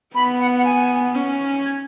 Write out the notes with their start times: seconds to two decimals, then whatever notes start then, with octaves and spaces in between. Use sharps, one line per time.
0.14 B3 B5
0.40 F#5
0.57 F#5
0.65 G#5
1.15 C#4
1.65 G#6